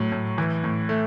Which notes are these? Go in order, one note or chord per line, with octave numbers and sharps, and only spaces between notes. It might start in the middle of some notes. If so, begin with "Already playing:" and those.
Already playing: A2 F#3
A2
E3
A2
A3